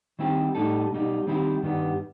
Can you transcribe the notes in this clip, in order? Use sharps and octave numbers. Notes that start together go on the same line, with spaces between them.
D#3 G3 C4 E4 G4
A2 G3 D#4 A4
B1 B2 G3 D#4
D#3 G3 C4 E4 G4
G2 D#3 G3 B3